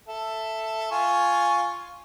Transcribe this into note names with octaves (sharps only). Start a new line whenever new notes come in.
A4 E5
F4 G#5 C#6